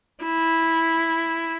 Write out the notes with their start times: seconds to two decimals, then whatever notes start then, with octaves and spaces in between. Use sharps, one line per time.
0.23 E4